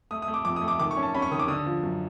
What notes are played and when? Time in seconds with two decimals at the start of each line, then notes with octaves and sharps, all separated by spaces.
0.11 A3 D#6
0.22 D#6
0.28 A3
0.34 D6
0.45 F2 D6
0.56 D#6
0.62 A3
0.68 D6
0.79 D#3 D6
0.91 C#6
0.97 C#4
1.03 A5
1.15 C#4 B5
1.22 C#6
1.31 D#3 D#6
1.39 D6
1.48 D3 D#6
1.66 F3
1.83 F#2